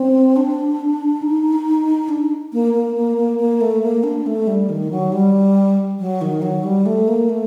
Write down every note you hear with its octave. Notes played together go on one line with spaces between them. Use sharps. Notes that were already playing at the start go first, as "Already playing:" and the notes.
Already playing: C4
D4
D#4
D4
A#3
A#3
A#3
A#3
A#3
A3
A#3
D4
A3
G3
D#3
F#3
G3
F#3
D#3
F#3
G3
A3
A#3
A3